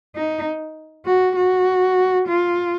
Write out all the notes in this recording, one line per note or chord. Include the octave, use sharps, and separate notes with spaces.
D#4
F#4
F#4
F4